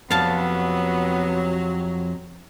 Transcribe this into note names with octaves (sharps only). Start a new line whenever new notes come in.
F2 C3 F#3 B3 F5 A5